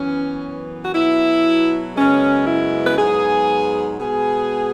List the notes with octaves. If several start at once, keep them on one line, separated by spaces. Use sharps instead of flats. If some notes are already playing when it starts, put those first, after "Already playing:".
Already playing: F#2 E3 B3 C#4
F#4
B2 F#3 B3 E4
F#2 C#3 G#3 B3 C#4
E4
B4
G#2 F#3 B3 G#4
B2 G#3 B3 G#4